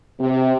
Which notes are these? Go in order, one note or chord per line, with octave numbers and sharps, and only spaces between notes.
C3